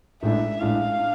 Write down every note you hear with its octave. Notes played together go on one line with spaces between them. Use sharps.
A1 A2 G#3 D4 E5
A1 A2 G#3 D4 F5
D4